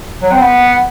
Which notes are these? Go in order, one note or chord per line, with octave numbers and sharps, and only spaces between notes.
F#3
C4
B3